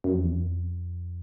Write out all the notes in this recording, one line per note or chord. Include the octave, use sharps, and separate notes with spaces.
F#2
F2
E2
F2